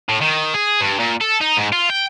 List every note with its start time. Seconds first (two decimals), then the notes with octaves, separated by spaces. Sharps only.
0.09 A2
0.21 D#3
0.54 G#4
0.81 G2
0.99 A#2
1.21 A4
1.41 D#4
1.57 G#2
1.73 F4
1.90 G5